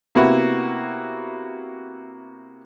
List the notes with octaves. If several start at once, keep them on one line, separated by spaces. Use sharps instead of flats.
C3 A#3 B3 E4 F#4